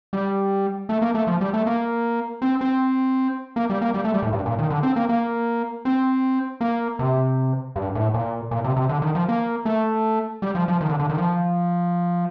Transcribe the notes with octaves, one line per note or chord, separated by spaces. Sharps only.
G3
A3
A#3
A3
F3
G3
A3
A#3
C4
C4
A#3
G3
A#3
G3
A3
G3
A2
G2
A#2
D#3
D3
C4
A#3
A#3
C4
A#3
C3
G2
A2
A#2
A#2
C3
C3
D3
D#3
F3
A#3
A3
G3
F3
F3
D#3
D3
D3
D#3
F3